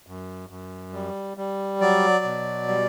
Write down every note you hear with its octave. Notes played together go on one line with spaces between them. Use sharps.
F#2
F#2
G3
G3
F#3 D5
B2
G3